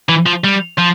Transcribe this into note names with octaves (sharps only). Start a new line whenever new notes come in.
E3
F3
G3
F3